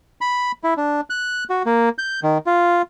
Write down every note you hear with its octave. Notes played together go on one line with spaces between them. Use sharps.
B5
E4
D4
F#6
F#4
A#3
G6
D#3
F4